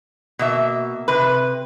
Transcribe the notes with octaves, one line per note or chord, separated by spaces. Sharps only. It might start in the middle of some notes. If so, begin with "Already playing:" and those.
B2 A#3 E5
C3 B4